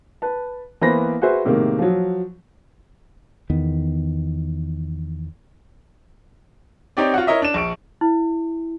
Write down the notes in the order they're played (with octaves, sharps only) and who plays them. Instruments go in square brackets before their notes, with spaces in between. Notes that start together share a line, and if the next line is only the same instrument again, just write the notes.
[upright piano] B4 A5
E3 A#3 B3 C5 B5 A#6
F#4 G#4 B4 C5 E5
A2 C3 D#3 G#3 A#3
F3 F#3
[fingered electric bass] E2 D#3 B3
[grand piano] C4 D#4 G4 C#5 D5
F4 F#4 F#5
E4 A#4 C#5 D#5 E5
D4 E7
A#1 C#6 D7
[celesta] E4